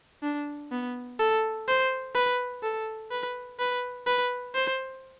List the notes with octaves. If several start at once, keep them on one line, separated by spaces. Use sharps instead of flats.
D4
B3
A4
C5
B4
A4
B4
B4
B4
C5